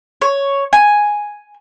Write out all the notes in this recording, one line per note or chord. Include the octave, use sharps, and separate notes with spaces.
C#5
G#5